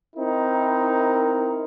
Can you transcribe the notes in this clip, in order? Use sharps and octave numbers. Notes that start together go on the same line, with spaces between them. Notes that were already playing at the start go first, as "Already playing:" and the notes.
C4 D#4 E4 A#4